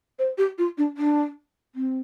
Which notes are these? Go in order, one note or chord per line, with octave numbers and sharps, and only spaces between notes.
C5
G4
F4
D4
D4
C4